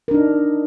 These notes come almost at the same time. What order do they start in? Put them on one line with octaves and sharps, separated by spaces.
A#4 D4 D#4